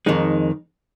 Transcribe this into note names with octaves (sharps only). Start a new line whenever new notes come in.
F2 D#3 G#3 D#4